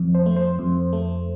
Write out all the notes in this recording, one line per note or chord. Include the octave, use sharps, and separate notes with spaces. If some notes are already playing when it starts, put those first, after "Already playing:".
Already playing: F2
C5
A3
C5
F2
A3